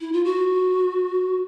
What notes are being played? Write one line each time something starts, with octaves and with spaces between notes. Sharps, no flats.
E4
F4
F#4